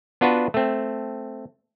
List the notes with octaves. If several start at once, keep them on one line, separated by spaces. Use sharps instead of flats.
B3 D4 F4 F#4 B4
A3 C4